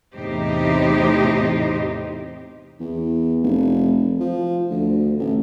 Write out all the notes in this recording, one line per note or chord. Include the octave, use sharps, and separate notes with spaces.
E2 A2 C3 D#4 G4 C5
E2
F1
F3
D2
A1